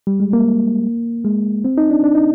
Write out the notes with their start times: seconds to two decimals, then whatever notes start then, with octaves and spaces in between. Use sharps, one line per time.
0.07 G3
0.20 G#3
0.33 A#3
1.25 G#3
1.65 C4
1.78 D#4
1.90 D4
2.04 D4
2.15 D#4